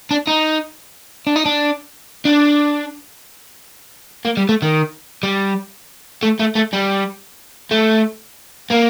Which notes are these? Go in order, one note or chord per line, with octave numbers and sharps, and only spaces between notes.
D4
D#4
D4
D#4
D4
D4
A#3
G3
A3
D#3
G3
A3
A3
A3
G3
A3
A#3